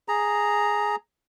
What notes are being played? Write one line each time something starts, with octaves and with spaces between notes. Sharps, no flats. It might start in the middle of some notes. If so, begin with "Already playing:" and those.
G#4 A#5